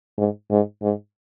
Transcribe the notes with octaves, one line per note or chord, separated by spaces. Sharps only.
G#2
G#2
G#2